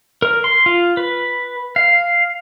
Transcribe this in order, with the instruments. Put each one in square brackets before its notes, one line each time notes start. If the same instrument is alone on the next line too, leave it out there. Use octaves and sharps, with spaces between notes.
[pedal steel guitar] A#4
C6
F4
B4
F5